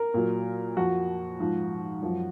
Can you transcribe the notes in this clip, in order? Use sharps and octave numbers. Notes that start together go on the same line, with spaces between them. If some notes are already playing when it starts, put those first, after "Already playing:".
Already playing: A#4
A#2 F#3
F2 F3 F#4
G#2 F3
F#2 F3